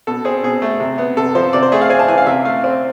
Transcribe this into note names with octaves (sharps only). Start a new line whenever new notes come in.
B2 A4
C4 G#4
B2 G#4
A3
C3
B3
C3 A4
F3 C5
C3 D5
C5
A3 G#4
F5
C4 G#5
A5
E3 G#5
F5
C3 E5
A3 F5
C4